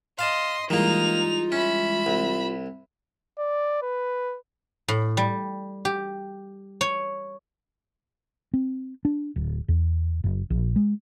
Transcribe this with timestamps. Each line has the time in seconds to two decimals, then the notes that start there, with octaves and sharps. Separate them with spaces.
0.19 D#5 F5 A5 C6
0.70 D#3 E3 G3 G#3 A#3 D#4 F4 F7
1.52 C#4 E5 B5
2.06 C2
3.38 D5
3.82 B4
4.88 A2
5.17 G3
5.85 G4
6.81 C#5
8.54 C4
9.05 D4
9.36 D1
9.68 E2
10.24 F#1
10.50 A#1
10.76 G#3